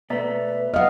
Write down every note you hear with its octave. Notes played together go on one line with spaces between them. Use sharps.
B2 A3 B4 D5 E5 A#5
B2 F#3 B3 D#5 F5 F#5 F6